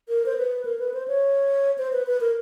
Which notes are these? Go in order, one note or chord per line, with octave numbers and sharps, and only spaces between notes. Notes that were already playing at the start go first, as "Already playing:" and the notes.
A#4
C5
B4
A#4
B4
C5
C#5
C5
B4
B4
A#4